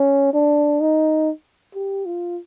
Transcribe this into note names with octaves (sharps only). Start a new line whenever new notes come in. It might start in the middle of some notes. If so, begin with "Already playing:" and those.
Already playing: C#4
D4
D#4
G4
F4